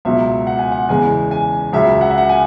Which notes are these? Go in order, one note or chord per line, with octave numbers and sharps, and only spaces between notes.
C#2 B2 F#3 E5
F#5
G#5
F#5
E2 C#3 E3 G#3 G#5
G#5
C#2 C#3 F#3 E5
F#5
E5
F#5
G#5